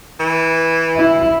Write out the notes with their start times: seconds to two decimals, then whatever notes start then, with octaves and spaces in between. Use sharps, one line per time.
0.20 E3
0.97 E4